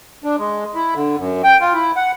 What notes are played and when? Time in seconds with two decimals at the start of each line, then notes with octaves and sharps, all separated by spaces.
0.24 D4
0.39 G#3
0.75 E4
0.95 D3
1.18 F#2
1.44 G5
1.61 F4
1.74 E4
1.96 F#5